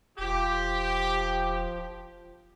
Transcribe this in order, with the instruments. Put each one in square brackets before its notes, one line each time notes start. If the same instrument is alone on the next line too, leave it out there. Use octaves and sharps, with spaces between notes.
[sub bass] E1 [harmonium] F3 [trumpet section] G4